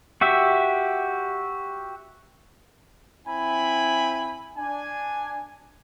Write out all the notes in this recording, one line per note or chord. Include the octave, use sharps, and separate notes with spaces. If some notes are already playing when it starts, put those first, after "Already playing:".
F#4 G4 E5
C4 E4 G#5 B5
D4 G#5